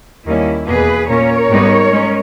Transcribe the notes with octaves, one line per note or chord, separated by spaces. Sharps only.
D#2 D#3 G3 A#3 C#4 E4
E2 B2 A#3 G#4 B4
A#2 A#3 C#4 A#4 C#5
G#2 G3 B3 D#4
G#3 C#4